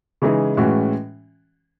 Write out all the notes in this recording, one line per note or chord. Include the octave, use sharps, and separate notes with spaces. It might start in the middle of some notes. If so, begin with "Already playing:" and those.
C#3 E3 G#3 D#4 G#4
A2 E3 G#3 C#4 F#4